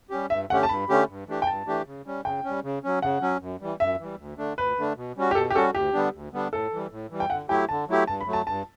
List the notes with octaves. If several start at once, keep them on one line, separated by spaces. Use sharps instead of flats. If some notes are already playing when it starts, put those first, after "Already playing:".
G3 C#4 G4
G2 E5
D3 A3 C#4 G4 F#5
A5
G2 B5
D3 A3 C#4 G4
G2
E3 A3 D4 G4
G5
G2 A5
E3 A3 D4 G4
C#3
G3 C#4
C#3 G5
G3 C#4
C#3
F#3 C#4
C#3 F#5
F#3 C#4
F#2
E3 G3
F#2 E5
E3 G3
D2
D3 A3 D4
D2 B4
D3 A3 D4
B2
G3 C#4 F#4
G4
B2 A4
G4
G3 C#4 F#4 A4
D2 G4
D3 G3 B3 D4
D2
D3 G3 B3 D4
A2 A4
E3 G3
A2
E3 G3
G5
D3 F#5
F#3 A3 E4 G4 G5
D3 A5
F#3 A3 E4 G4
G2 A5
B5
F#3 A3
A5
G2 A5